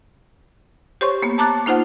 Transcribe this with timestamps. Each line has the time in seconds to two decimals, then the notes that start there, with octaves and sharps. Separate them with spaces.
1.01 G4 C5 C#5 C6 C#6
1.22 A#3 B3
1.38 A5 A#5 D6 F#6 A6
1.66 A#3 D#4 F4 C5 F#5